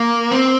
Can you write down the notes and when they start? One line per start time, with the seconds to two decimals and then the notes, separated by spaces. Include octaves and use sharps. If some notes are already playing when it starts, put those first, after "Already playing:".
Already playing: A#3
0.31 C4